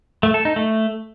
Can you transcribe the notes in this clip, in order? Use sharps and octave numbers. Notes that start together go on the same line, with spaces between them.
A3
A4
D#4
A3